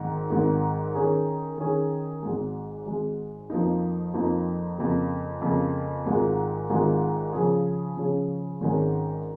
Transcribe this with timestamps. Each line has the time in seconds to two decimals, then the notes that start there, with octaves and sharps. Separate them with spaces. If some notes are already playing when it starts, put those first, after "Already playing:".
Already playing: G#1 G#2 D#3
0.30 G#1 G#2 D#3
0.95 D#3 C#4 G#4
1.58 D#3 C#4 G#4
2.22 G#1 G#2 G#3
2.86 G#1 G#2 G#3
3.50 F2 F3 A#3 D#4
4.14 F2 F3 A#3 D#4
4.78 F2 C#3 A#3
5.41 F2 C#3 A#3
6.05 G#1 G#2 D#3 G#3 F4
6.69 G#1 G#2 D#3 G#3 F4
7.32 C#3 F3 C#4 G#4
7.97 C#3 F3 C#4 G#4
8.61 G#1 G#2 D#3 G#3 C#4